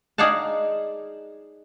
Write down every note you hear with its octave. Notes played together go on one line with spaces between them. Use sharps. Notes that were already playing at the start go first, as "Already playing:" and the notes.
D#4 G#4 D5 F5 F#5 A5